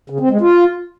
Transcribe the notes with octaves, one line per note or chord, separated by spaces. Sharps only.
C#3
C4
G#3
F4